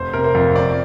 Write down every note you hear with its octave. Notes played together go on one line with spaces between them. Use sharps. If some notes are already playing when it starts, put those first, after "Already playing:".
Already playing: F1 C5
C3 A#4
C5
F2
C4 D5